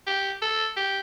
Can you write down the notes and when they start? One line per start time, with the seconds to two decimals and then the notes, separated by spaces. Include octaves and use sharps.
0.07 G4
0.42 A4
0.76 G4